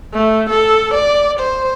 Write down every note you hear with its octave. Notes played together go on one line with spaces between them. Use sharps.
A3
A4
D5
C5